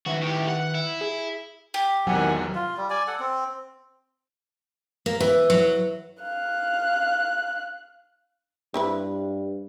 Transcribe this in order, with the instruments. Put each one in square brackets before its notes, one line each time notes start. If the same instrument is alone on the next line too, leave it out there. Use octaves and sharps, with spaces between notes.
[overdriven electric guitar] F2 F#4 [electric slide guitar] D#3 B4 E5
[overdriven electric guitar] A2 G4
F#5
E4
[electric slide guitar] G#4
[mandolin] G4
[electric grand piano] G#1 E2 C3 [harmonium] D#3 F#5 G#5 [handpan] F#3
[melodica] F4
G3
D5 G#5
A4 F#5
C4
[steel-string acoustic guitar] A#3
E3
F#3
[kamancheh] F5 F#6
[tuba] G2 [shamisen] C4 E4 B4